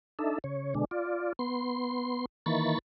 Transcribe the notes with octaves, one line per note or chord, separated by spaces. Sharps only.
D4 D#4 A4 E5
C#3 C#5
B2 D3 G#3 D4
F4 D5
B3 C6
D#3 E3 A#3 B5 C#6 A6